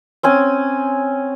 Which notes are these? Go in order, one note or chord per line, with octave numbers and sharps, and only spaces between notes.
C4 C#4 G#5